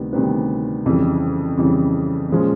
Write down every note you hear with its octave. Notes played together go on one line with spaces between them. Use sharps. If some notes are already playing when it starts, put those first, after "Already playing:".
Already playing: D2 C3 D#3 G3 B3
D2 C3 D#3 G3 B3
F2 C#3 E3 G3
F2 C#3 E3 G3
A#2 F3 G#3 C#4